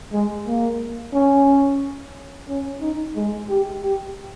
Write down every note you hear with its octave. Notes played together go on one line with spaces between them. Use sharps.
G#3
A#3
C#4
C#4
D#4
G#3
G4
G4